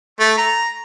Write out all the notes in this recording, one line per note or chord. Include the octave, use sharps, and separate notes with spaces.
A3
A#5